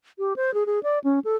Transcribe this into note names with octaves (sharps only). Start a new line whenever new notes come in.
G4
C5
G#4
G#4
D5
C#4
A4